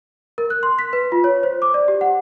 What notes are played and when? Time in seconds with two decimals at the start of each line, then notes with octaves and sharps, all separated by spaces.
0.38 A#4
0.50 F#6
0.63 C6
0.79 B6
0.93 B4
1.12 F4
1.24 C#5
1.43 C5
1.62 D6
1.74 D5
1.88 G4
2.01 F#5